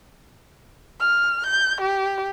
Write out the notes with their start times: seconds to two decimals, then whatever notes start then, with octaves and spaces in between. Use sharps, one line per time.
1.00 F6
1.46 G6
1.81 G4